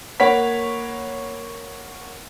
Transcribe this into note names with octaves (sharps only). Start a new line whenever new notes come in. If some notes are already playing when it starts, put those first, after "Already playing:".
A#3 C#5 F#5 B5 B6